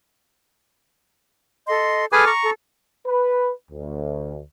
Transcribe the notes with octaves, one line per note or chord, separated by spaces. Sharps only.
A4 D#5 C6
G#4 A4 B4 G#5 D6 F6
A#5 C#6
A4
B4
D2